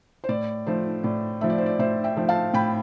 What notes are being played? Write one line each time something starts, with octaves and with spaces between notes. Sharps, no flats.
C5
A2 D5
F3 A3 C5
A2 D5
F3 A3 E5
D5
C5
D5
A2 C5 E5
E5 G5
F3 A3
F5 A5
A2 G5 B5